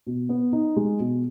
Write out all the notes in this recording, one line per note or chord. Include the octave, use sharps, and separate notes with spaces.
B2
B3
D#4
G#3
B2